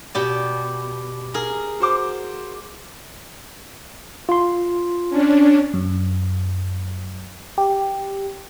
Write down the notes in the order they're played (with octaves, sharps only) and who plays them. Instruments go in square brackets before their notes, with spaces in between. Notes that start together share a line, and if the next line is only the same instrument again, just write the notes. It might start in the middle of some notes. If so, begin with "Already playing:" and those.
[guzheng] B2 G4 D5
G#4 A#4
[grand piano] F#4 C5 D6
[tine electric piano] F4 C6
[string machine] C#4 D4
[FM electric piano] F#2
G4